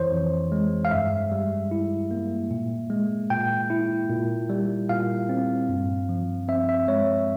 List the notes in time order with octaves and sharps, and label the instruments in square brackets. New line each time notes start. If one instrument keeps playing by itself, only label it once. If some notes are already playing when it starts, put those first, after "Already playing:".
Already playing: [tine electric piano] F2 E3 C5 C#5
F2
G#3
F5
G2 E5
G3
E4
A#3
A#2
G#3
A#2 G5
E4
A#2
G3
A#2 F5
C4
G2
F3
C4 E5
E5
G#3 C#5